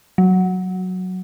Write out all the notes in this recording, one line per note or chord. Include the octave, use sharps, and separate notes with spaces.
F#3